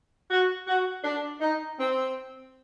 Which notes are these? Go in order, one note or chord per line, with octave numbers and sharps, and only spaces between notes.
F#4
F#4
D4
D#4
C4